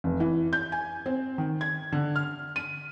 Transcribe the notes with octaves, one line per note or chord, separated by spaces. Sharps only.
F1
E3
G6
G#5
C4
D#3
G#6
D3
F6
D#7